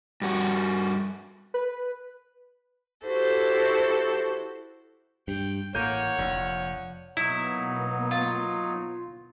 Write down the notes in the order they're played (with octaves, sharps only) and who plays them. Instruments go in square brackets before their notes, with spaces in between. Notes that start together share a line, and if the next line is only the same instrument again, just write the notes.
[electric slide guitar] G2 F#4
[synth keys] B4
[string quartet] E4 F#4 G4 A4 C5
[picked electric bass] G2 [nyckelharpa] G5
[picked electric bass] A1 A2 [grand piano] A#3 G6 D#7 [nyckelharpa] C#5 F#5
[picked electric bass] F1 [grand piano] A#1
[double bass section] B2 A#3 B3 [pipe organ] F#3 D#4 [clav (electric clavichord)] E4
[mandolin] F4